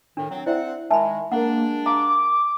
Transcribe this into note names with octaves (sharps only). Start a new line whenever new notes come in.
A2 D#3 D4
F#3 C4
C4 E4 C5 D5 E5 F#5
D#3 G#3 E5 G#5 A5 B5
G#3 A#3 D4 A#4 F#5
F5 A#5 D6